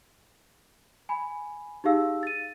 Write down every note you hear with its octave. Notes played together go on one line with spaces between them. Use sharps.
G#5 B5
D#4 G4 G#4 F5 E6
A6 D#7